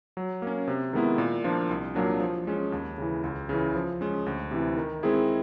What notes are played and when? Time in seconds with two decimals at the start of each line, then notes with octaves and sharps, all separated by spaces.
0.17 F#3
0.42 A#3 C#4
0.68 C3
0.93 D#3 G#3 B3 E4
1.18 A#2
1.44 F3 A#3 D4 F4
1.70 C2
1.95 A#2 F#3 A#3 D4
2.20 F3
2.47 G#3 C#4
2.72 D#2
2.98 C#3 E3
3.23 C#2
3.49 C#3 E3
3.75 F3
4.01 G#3 C#4
4.26 D2
4.51 C3 E3
4.77 D#3
5.03 G#3 C4 E4 G#4